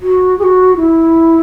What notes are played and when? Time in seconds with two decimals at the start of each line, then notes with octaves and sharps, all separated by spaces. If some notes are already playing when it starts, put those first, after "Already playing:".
0.02 F#4
0.39 G#4
0.43 F#4
0.77 E4